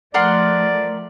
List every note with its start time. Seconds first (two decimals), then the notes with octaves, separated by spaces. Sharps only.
0.14 F3 A3 A#4 D5 F#5 C6